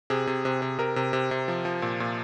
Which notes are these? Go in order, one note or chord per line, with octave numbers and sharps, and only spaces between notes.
C3 G#4
C3
C3
C3
C3 A#4
C3
C3
C3
F3
F3
A#2
A#2